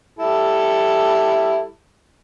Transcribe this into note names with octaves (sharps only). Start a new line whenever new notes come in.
G3 E4 A4